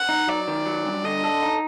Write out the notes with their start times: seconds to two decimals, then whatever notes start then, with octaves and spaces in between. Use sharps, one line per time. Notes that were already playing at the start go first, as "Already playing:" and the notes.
Already playing: F#5
0.09 D#4
0.27 F#3 D5
0.48 D#3
0.66 F#3
0.85 G2
1.04 D3 D#5
1.24 A4
1.42 D#4